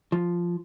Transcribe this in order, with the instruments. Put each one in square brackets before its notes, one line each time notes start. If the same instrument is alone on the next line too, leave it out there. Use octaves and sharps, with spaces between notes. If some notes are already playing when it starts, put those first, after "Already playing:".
[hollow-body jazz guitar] F3